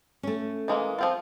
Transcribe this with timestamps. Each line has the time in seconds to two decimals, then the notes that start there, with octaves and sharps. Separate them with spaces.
0.23 A3 C#4
0.68 E3 G#3 A#3
0.99 F3 C4 F4